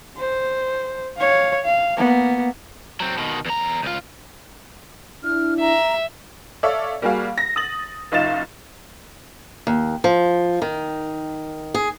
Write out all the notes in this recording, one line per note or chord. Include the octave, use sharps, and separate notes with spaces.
C5
C#5 F5
F5
A#3 B3
F#3 C4
B2 D#3
E2 A#5
C#2 F4
D4 E4 F6
E5 A#5
A4 C#5 D5 E5 F5
G3 A#3 F#4 G#4 F5
A#6
D#6 A6 F#7
F#1 D#4 F4 F5 A6 E7
D#2
F3
D#3
G#4